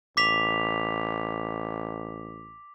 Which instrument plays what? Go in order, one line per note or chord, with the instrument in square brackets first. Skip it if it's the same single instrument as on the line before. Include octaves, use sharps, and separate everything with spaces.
[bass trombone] A1 [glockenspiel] D6 B6 F7